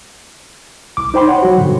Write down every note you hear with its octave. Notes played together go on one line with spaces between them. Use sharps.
C2 D6
D#4 C5 G5 B5 C6
C#5 F#5
F#3 F#4
G2 B2 D3